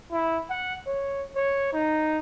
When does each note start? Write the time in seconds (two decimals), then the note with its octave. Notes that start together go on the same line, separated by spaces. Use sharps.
0.12 E4
0.50 F#5
0.87 C#5
1.36 C#5
1.73 D#4